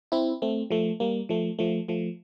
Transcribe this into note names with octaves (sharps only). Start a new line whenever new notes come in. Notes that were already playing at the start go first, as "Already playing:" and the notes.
C4 E4
A3 C4
F3 A3
G3 A#3
F3 A3
F3 A3
F3 A3